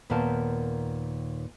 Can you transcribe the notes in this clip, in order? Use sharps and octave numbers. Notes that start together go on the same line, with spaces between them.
D#2 A#2 D#3 B3 A#4 A5